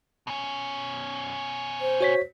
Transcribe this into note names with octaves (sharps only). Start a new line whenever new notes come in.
B2 C#4
C5
F#4 C#5 B6